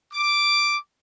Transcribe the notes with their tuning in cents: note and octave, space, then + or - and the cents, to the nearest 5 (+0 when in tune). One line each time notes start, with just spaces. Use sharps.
D6 +0